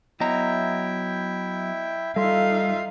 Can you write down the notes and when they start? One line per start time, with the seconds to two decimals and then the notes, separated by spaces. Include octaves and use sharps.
0.20 F#3 B3 E4 D#5 E5 G5 A#5
2.16 G3 D#4 F4 A4 E5 F5 C6